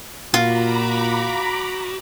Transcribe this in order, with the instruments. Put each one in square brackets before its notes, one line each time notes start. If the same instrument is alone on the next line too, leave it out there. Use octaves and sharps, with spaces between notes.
[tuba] A#2 [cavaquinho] F4 [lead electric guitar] F#4 [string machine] A#5 B5 D6